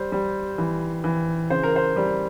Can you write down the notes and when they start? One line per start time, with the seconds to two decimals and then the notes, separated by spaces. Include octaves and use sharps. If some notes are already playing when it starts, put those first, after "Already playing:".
Already playing: G3 C5
0.12 G3
0.58 E3
1.04 E3
1.50 C#3 C5
1.64 A#4
1.76 C5
1.96 G3